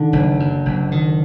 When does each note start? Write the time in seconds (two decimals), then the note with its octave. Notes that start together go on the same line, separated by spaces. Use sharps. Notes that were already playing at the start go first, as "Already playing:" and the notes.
Already playing: D3 D#3
0.13 F#1
0.40 F#2
0.65 F#1
0.92 D#3